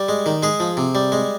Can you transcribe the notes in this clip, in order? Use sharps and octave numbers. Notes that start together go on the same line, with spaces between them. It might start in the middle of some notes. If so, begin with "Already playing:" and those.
Already playing: G3 G4
G#3
D#3
G#3 G#4
F3
C3
G3
G#3